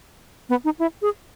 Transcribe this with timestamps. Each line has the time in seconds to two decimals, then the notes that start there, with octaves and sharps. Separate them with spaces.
0.49 B3
0.64 D#4
0.79 E4
1.02 G#4